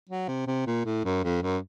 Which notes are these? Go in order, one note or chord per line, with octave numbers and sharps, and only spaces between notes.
F#3
C3
C3
A#2
A2
F#2
F2
F#2